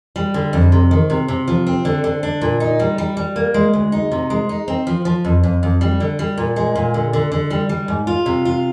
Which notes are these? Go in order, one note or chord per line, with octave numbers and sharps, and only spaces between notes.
G3
D3
F2
C3
D#3
C3
C3
F3
C4
D3
D3
D4
A#2
D#4
G3
G3
G3
A#3
G#3
D2
D#4
C3
G#3
D#4
C4
F3
F3
F2
F2
F2
G3
D3
G3
A#2
G#3
A#2
D3
D3
D3
G3
G3
G#2
F4
C3
F4